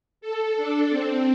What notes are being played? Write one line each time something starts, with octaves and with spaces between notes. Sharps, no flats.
A4
D4
C4